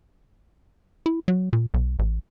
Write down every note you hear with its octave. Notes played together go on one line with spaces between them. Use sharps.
E4
F#3
A#2
B1
A1